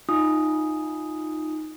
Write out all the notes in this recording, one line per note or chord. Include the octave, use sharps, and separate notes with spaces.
D#4 F4 G#5 D#6